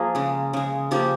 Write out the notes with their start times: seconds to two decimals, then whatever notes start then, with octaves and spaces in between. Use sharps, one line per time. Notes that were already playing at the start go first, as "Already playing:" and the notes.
Already playing: F3 A#3 G#4 A#4
0.15 C#3 G#3
0.53 C#3 G#3
0.91 C#3 F3 A#3 G4